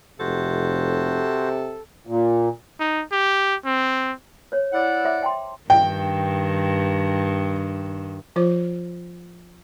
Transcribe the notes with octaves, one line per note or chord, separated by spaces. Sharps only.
F1 C3 F#4 A4 C5
A#2
D#4
G4
C4
C5 C#5
E4 D5 F#5
C5 E5 D6
G5 A5 C6
G2 D#3 G5
F3 F4 C5